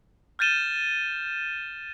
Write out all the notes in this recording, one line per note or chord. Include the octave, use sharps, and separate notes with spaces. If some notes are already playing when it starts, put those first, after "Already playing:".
F6 G6 A6 D#7 E7 G7